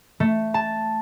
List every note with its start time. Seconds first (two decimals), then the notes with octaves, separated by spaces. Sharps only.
0.20 A3
0.54 A5